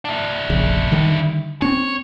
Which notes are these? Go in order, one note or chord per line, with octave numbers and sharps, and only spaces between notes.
D4 E4
F1 A#1 C#3
D3 D#3 G3
C4 C#4 C#5